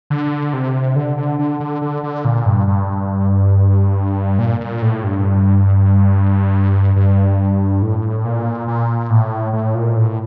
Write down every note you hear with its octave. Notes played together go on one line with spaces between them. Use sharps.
D3
C3
D3
D3
D3
D3
D3
D3
A#2
G2
G2
A#2
A#2
A2
G2
G2
A2
A#2
A#2
A2
A2
A#2
A2